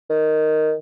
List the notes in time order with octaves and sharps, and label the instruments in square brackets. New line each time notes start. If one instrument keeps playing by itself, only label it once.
[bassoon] D#3